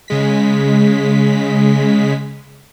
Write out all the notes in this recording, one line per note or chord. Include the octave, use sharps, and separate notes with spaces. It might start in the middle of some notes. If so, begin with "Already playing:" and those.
C#3 G#3 B6